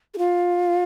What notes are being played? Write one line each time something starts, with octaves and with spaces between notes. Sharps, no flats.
G#4
F4